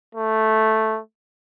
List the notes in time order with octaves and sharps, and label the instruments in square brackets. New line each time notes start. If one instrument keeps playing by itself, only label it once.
[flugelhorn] A3